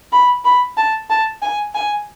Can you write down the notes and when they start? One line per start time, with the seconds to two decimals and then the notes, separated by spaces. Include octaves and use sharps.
0.12 B5
0.45 B5
0.77 A5
1.10 A5
1.43 G#5
1.75 G#5